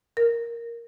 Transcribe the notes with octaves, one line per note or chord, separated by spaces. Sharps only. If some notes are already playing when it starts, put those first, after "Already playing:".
A#4